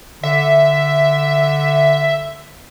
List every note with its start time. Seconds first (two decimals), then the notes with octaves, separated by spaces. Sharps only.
0.23 D3 E5